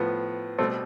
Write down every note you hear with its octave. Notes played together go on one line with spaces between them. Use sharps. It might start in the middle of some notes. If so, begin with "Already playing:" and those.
Already playing: A2 F3 B3
B2 G3 A3 C4